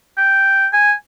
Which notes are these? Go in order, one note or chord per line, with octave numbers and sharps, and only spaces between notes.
G5
G#5